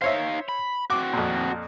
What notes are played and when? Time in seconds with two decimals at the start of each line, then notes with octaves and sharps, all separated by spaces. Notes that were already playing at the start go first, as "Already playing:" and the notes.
0.02 D#4 C5 C#5 E5 F5
0.49 B5
0.90 C4 F#4 D6
1.13 F2 A#2